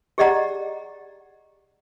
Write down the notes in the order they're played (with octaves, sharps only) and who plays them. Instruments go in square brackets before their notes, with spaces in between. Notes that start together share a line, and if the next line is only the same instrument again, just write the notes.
[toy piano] G4 G#4 D5 D#5 F#5 A#5